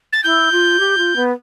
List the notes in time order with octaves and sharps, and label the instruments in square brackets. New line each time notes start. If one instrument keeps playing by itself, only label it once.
[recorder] A6
[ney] E4 [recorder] G6
[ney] F4
G4
F4
B3